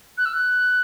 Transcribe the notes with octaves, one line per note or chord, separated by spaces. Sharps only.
F#6
E6
F#6